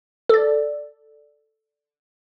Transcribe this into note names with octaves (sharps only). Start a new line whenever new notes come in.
A4 D5